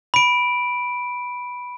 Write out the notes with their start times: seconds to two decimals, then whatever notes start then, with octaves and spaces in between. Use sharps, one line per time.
0.14 B5 D7